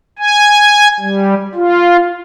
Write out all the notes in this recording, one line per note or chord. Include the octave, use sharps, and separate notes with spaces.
G#5
G3
F4